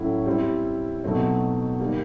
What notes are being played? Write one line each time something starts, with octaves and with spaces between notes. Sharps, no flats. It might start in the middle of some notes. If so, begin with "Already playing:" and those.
Already playing: A2 F#3 A3 C#4 E4
G3 C4 E4
B2 F#3 A3 C4 D#4
D#3 G3 A#3